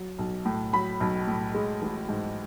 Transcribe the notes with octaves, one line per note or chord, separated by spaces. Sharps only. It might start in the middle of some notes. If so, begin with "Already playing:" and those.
Already playing: F#3
B1
A2
F#3 B5
B1
A2
G#3
A1
G#2